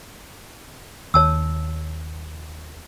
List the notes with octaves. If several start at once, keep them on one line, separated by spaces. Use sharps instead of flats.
D#2 C#5 A5 E6